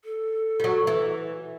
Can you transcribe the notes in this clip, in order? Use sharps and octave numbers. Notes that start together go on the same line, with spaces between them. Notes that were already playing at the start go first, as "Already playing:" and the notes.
A4
F#3 G3
E3